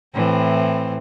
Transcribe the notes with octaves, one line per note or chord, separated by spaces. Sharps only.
A2 E3 C4